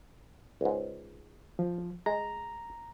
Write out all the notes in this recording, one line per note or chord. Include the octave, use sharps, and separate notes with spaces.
C#2 G#2
F3
G#3 A#5